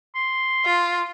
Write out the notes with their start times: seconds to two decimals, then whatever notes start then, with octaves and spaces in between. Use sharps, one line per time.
0.15 C6
0.65 F4